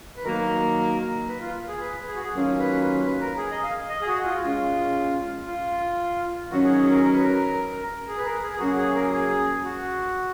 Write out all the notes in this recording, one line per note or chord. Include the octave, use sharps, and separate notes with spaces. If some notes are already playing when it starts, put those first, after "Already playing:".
B4
D#3 F#3 A#3 A#4
B4
F4
G#4
B4
G#4
F#4
G#4
D#3 F#3 A#3 C#4 F4
B4
B4
A#4
G#4
D#5
F5
D#5
G#4
F#4
F4
A#2 G#3 C#4 F4
F4
D#3 F#3 C#4 F#4
G#4
G#4
A#4
A#4
B4
A#4
G#4
B4
A#4
G#4
G#4
C#3 F#3 A#3 C#4 F#4
G#4
A#4
G#4
F#4